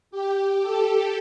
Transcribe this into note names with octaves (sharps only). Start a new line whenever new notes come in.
G4
A4